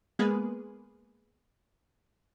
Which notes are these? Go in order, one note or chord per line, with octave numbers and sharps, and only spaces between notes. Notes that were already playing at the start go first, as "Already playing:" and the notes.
G#3 A#3 B3 G#4 B4